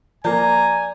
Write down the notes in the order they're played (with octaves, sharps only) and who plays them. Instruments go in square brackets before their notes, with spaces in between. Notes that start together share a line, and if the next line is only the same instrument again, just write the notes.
[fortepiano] F3 A#3 [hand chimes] D5 G6 [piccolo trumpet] G#5 [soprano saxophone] A#5